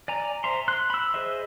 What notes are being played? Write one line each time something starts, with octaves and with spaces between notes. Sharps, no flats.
D5 G#5 A#5
C5 E5 A#5 C6
C6 F#6
B5 E6
G#4 C5 D#5 E5